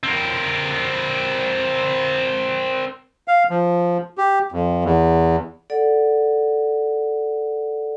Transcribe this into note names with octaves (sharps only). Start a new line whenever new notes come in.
C4 A#4
F5
F3
G4
F2
E2
A4 D5 F#5